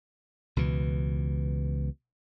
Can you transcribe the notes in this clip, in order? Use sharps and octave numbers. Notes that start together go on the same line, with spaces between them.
C#2 B2 E3